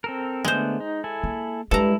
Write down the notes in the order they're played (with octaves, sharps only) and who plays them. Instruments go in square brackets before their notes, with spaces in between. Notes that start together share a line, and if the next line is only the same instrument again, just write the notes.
[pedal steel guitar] C4 A4 A#4
[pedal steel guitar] D3 A3 B3 [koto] G#3 C5
[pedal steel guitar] D#4
E4 A4 G#5
[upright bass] A#3
[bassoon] G2 [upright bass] G3 G#3 [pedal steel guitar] E4 [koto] A4 A#5